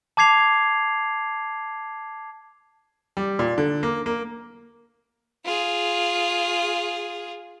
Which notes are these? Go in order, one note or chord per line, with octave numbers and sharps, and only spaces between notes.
A5 D6 G#6 C7 F7
G3
A#2
D3
A#3
A#3
F4 G#4